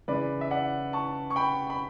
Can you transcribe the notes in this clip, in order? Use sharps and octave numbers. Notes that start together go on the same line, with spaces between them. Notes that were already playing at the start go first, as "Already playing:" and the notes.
C#3 E3 B4 D5
E5
D5 F#5
A5 C#6
C#6
G5 B5
B5